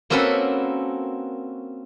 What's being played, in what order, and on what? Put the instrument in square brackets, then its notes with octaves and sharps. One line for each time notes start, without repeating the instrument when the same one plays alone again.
[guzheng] A#3 C4 C#4 F#4 A4 B4